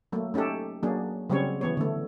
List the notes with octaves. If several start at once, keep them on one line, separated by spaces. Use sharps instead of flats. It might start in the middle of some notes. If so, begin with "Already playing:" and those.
F#3 A3 A#3
A3 C#4 D#4 G4 A4
F#3 A#3 D4 G#4
C#3 F#3 G3 C4 C#4 C#5
E3 B3 C#5
D3 A3